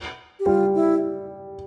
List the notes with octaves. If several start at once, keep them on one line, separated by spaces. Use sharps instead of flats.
G4
G3 F4
E4